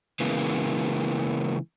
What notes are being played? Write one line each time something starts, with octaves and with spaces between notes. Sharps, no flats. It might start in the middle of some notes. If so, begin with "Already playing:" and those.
C#3 E3 G#3 A#3 B3